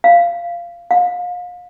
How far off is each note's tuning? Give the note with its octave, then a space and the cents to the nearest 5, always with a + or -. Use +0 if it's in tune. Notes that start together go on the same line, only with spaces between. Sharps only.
F5 -15
F5 +35